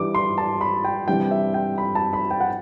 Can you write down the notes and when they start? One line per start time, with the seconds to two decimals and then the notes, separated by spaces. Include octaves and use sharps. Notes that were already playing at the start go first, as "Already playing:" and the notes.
Already playing: G2 E3 G3 D6
0.15 C6
0.38 A5
0.61 B5
0.84 G5
1.08 C3 E3 G3 D4 G5
1.31 E5
1.54 G5
1.78 B5
1.95 A5
2.13 B5
2.31 G5
2.40 F#5